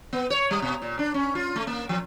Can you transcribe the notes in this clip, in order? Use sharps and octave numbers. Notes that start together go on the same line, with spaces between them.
B3
C#5
G3
B2
A#2
D4
C#4
F4
A3
A#3
F3